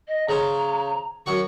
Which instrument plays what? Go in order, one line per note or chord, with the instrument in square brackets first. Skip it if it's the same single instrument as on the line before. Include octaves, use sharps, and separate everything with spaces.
[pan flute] D#5
[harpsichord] C#3 C5 [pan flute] A#5
[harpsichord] F#2 F#5 C#6 [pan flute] F#4